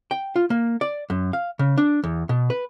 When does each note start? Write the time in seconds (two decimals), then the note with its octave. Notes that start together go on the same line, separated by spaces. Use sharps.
0.11 G5
0.36 F4
0.50 A#3
0.81 D5
1.10 F#2
1.33 F5
1.59 C#3
1.78 D4
2.04 E2
2.29 B2
2.50 B4